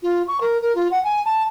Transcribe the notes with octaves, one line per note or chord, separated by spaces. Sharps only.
F4
C#6
A#4
A#4
F4
F#5
G#5
A5